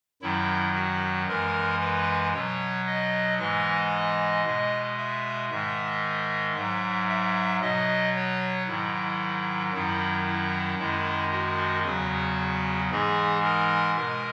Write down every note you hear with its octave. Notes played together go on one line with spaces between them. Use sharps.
F#2 D#3 F#3 E4
F#4
F#2 E3 G#3 A#4
B4
B2 F#3 C#5
D#5
G#2 E3 G#3 D#5
B2 G#3
E5
G#2 D#3 G#3 E5
G#2 F#3 E5
E5
B2 F#3 D#5
C#5
G#2 D#3 F#3 E4
F#2 D#3 F#3 E4
E4
F#2 D#3 G#3 E4
F#4
E2 C#3 F#3 F#4
G#2 E3 G#3 G#4
A#4
B2 G#3 A#4